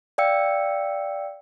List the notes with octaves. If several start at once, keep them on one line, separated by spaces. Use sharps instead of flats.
D5 F5 G5 E6 C#7